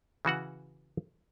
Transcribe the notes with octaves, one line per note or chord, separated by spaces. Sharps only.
C#3 E3 F#4 F#5